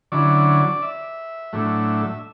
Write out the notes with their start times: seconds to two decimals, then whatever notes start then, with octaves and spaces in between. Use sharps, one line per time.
0.12 D3 F#3 C#4 E4 D5
0.82 E5
1.53 A2 F#3 A3 D4